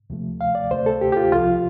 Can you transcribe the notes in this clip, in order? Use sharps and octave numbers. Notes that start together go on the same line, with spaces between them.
D2 C3 F3 A3
F5
D5
D2 C3 A3 C5
A4
G4
G4
F4
C2 C3 F3 F4